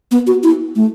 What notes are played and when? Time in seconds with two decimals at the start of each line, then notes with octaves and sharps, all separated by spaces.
0.11 B3
0.27 F#4
0.43 E4
0.76 A3